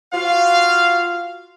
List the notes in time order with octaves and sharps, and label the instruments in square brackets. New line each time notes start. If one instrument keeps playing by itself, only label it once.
[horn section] F4 F#4 F5